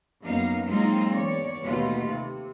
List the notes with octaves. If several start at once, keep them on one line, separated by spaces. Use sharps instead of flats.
F#2 A#3 B3 D#4 F5
F#3 G#3 A#3 C4 D#4 F4
E2 C#5 D5
D#2 B2 A3 D#4 F4 B4
C3